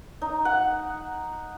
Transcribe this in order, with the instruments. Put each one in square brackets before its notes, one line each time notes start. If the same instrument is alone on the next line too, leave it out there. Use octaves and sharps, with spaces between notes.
[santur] D#4
F#5